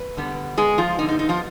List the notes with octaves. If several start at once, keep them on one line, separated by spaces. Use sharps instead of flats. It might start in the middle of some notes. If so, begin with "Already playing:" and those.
Already playing: B4
D3 G3 B3
G#3 G#4
F3 F4
D3 G3 B3 D#4
D#4
D#4
F3 F4